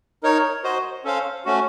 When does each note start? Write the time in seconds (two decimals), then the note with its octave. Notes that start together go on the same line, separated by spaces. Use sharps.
0.23 D#4 A#4 C#5
0.64 F#4 C5 D#5
1.04 C#4 A4 C5 F5
1.45 A3 C#4 F#4